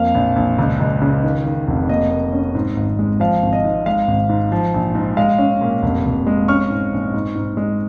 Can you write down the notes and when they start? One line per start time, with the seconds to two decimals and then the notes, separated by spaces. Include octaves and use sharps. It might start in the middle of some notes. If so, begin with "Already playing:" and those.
Already playing: F2 A#3 F5
0.15 A#1
0.36 A#1
0.59 C#2
0.80 C#2
1.02 C#3
1.23 D#3
1.45 D#3
1.68 F1
1.89 A#3 D#5
2.11 A#3
2.33 C#4
2.55 G#2
2.76 G#1
2.99 G#3
3.20 F3 F5
3.43 G#1
3.53 D#5
3.64 G#2
3.86 G#3 F5
4.08 G#1
4.29 G#2
4.52 F3
4.74 A#1
4.95 G#2
5.17 G#3 F5
5.38 C#4
5.61 A#2
5.82 F1
6.05 F1
6.27 G#3
6.48 C#4 C#6 F6
6.70 G#2
6.92 A#1
7.14 G#2
7.35 G#2
7.57 G#3